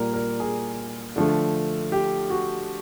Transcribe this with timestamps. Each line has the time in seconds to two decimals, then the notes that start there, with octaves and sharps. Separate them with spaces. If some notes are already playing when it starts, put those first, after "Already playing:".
Already playing: A#2 G3 A#4
0.14 A#4
0.40 G#4
1.16 D3 F3 A3
1.92 G4
2.30 F#4